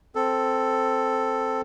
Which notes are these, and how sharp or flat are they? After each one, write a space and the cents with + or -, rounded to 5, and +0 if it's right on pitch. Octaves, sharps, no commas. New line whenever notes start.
C4 +0 A4 +0